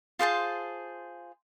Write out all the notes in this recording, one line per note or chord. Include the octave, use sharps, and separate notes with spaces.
F4 G#4 C5 A5